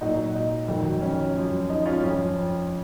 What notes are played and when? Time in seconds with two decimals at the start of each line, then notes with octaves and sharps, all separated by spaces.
0.01 A#2 F#3 D#4 F#4
0.35 D#4
0.68 F2 D#3 F#3
1.01 C#4
1.35 F#2 F3
1.70 D#4
1.86 C#4 F4
2.03 F2 F3 C#4